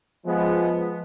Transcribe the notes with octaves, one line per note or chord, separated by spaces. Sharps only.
F3 G#3 B3